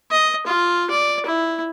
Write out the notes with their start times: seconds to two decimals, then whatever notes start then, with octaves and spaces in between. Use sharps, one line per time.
0.11 D#5
0.46 F4
0.90 D5
1.26 E4